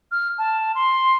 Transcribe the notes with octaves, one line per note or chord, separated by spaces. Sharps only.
F6
A5
C6